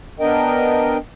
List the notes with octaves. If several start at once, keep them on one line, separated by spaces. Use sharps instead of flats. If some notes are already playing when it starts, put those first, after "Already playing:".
B3 D4 A#4 D#5 G5